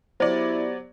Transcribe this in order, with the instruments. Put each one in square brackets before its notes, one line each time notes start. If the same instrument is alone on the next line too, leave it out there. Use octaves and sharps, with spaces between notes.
[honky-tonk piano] F#3 D5 [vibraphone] B3 G4 [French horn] E4 [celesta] C5